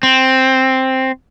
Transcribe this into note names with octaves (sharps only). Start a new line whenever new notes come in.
C4